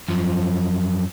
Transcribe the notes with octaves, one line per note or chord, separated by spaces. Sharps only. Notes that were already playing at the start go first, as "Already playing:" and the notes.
F#2 F3